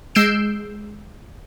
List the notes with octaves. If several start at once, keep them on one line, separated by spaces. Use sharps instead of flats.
G#3 E6 G6 C7 D7 E7